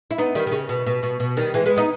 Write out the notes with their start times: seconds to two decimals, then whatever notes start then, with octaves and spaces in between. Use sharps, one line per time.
0.11 E4
0.18 B3 D#4
0.35 D#3 G3
0.47 D#3
0.52 C#3
0.69 B2
0.86 B2
1.03 B2
1.20 B2
1.37 D#3 G3
1.54 E3 G#3
1.66 G#3 B3
1.76 B3 D#4